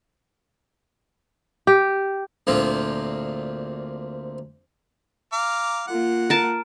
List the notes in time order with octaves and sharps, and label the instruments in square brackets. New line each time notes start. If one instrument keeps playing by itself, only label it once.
[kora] G4
[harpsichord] D2 A#2 F3 C4
[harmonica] F5 A#5 D6
[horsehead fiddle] A#3 F4 [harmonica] F#5
[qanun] A#4 A5